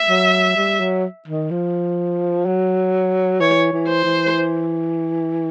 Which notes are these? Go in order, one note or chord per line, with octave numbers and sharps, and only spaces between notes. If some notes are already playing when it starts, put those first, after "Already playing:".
Already playing: E5
F#3
G3
F#3
D#3
F3
F#3
E3 C#5
E3
C5
E3